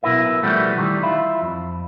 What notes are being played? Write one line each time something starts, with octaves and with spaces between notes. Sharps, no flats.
B1 B2 E4 A#4 B4 E5
B2 E3 F3 G3 A3 B3
D#3 E3 G3
E4 F4
F2